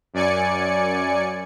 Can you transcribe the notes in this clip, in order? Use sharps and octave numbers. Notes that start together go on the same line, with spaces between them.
F#2 D5 G#5 C#7